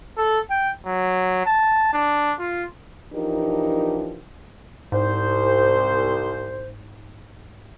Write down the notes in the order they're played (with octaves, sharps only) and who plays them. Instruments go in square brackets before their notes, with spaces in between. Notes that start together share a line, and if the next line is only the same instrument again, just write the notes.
[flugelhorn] A4
G5
F#3
A5
D4
F4
[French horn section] E3 F3 D4 D#4 G4 A#4
[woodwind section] C2 C5 [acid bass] G#2